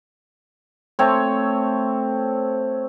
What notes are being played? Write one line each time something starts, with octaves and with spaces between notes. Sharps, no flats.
A3 C4 C#5